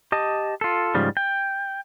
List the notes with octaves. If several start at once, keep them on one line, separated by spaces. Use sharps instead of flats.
G4 D#5 A5
F4 A4
G#2 C#3 F3 G3
G5